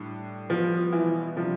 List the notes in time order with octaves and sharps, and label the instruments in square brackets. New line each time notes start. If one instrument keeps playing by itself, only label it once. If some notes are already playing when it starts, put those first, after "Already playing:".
Already playing: [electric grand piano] A2 G3 D4
[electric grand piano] B2 G3 B3 [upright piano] F3
[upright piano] E3
[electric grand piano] C3 G3 D4 [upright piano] F3